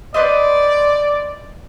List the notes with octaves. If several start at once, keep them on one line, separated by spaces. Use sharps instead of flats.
B4 C5 D5 D#5